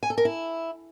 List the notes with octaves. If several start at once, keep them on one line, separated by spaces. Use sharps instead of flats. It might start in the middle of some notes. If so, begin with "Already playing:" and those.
G#5
A4
A#4
E4